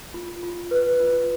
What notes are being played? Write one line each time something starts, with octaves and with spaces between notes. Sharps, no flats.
F4
F4
B4
F4